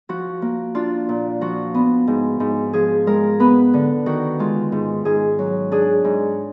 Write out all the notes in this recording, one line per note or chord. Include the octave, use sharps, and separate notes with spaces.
F3 F#4
A#3
D4 F4
A#2
F3 F#4
B3
G#2
G#2
F3 G#4
G#3 A#4
B3 B4
D3
D#3 F#4
G#3 F4
G#2
G#2 G#4
F#3
D4 G#4
G#2